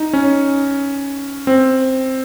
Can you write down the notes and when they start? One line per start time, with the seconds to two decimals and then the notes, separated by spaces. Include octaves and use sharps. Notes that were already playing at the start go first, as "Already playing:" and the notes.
Already playing: D#4
0.13 C#4
1.47 C4